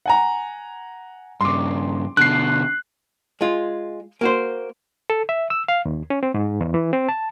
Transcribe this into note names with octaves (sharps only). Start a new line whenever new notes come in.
F#5 G#5 A#5
G2 C#3 C6 D6
B2 D3 F#6 C7
G#3 F4
A#3 F#4 C5
A4
E5
E6
F5
D#2
C#4
C4
G#2
E2
E3
C4
A5